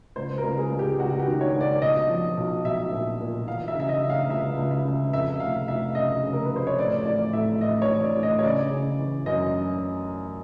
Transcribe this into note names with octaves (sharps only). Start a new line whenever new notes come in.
C#2 C5
A#4
C#2
G#4
C#2
G4
C#2 F#4
F#4
G4
D#3
C#5
C#2
D5
B1 D#5
F3
B1
B1 E5
A#2
A#2
E3 F5
E5
C#3
E5
D#5
C#3
F5
C#2 E5
C#2
E5
C#3
F2 E5
F1 F5
F1 E5
C#3 D#5
C#3
A#4
B4
F2
C5
C#5
A2 D5
A1 D5
A2 E5
A1 D#5
C#5
E3
D5
A1
D#5
C#5
C#3 D5
C#3
E3
F#2 D#5